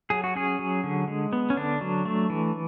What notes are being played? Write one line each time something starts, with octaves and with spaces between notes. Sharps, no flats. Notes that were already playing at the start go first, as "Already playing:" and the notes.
F#3 G#4
F#4
C#4 G#4
F#3
D3
G#3
B3
C#4
D3 D4
F#3
A3
E3